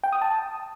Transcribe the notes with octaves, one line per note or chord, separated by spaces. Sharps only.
G5
D#6
A5